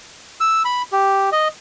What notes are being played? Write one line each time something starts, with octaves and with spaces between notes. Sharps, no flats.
E6
B5
G4
D#5